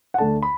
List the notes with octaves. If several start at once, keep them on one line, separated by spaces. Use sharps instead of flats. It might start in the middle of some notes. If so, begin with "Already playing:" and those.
F#5
D2 D3 A3 D4 A5
B5